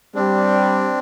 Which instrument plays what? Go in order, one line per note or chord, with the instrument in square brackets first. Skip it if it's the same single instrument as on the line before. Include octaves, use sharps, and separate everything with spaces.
[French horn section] G3 [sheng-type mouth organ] C4 D4